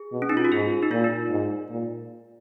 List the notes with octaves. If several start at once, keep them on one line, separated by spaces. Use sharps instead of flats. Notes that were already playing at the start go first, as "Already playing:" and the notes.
Already playing: G#4
B2
C#4
D#4
F4
F#4
G#2 G#4
D#4
A#2 F4
D#4
G#2
A#2